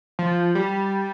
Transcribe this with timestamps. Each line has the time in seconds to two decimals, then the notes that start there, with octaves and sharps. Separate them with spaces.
0.19 F3
0.55 G3